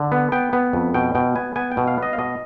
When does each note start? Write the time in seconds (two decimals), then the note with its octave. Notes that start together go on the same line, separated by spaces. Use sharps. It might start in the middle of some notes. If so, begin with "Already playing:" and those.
Already playing: D3
0.12 B3
0.32 B3 G5
0.53 B3
0.73 F2
0.94 B2 G5
1.15 B2 G5
1.36 B3 G#5
1.56 B3 G#5
1.72 G5
1.77 B2
1.88 F5
1.98 B3 D#5
2.13 F5
2.18 B2 D#5